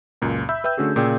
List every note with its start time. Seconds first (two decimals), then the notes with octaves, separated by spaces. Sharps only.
0.22 C#2 F#2 A#2
0.49 E5 B5 E6 G6
0.64 B4 E5 G5 E6 G6
0.78 D3 A3 C#4 F#4 G#4
0.96 A#2 C#3 G#4 D5 G5 G6